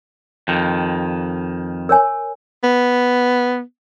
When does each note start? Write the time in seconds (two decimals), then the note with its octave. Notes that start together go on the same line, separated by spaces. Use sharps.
0.48 F2 D#3
1.89 A#4 C#5 G#5
2.64 B3